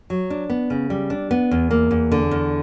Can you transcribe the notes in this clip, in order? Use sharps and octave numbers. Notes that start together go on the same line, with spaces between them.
F#3
D4
B3
C#3
G3
D4
B3
E2
A#3
E2
D3
E2